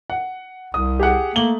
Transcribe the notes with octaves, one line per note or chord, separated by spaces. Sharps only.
F#5
C2 D#6
G4 G#4 F#5
A3 A#3 F#7 G7